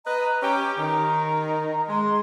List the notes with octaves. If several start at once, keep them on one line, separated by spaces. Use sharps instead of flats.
B4 D#5 A#5
C#4 G4
D#3 A#5
G#3 C6